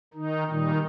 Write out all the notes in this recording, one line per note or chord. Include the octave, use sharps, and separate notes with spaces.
D#3 D#4
A#2 D#3 G3 D#4